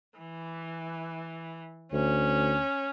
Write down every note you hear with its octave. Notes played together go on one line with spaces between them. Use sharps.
E3
D2 C#4